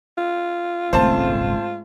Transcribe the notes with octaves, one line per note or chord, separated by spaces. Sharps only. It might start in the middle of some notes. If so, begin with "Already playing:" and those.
F4
D#1 G#1 C#2 G#2 A3 C4 C5 A5